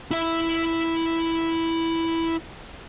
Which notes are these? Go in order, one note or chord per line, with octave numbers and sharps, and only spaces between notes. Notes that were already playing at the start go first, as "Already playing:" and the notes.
E4 E5